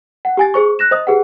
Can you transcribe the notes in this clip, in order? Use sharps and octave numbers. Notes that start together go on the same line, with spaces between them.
F#5
G4 G#5 A6
G#4 C5 C#6
F#6 A#6 E7
C5 D#5 D#6
G4 G#4 B4 F#5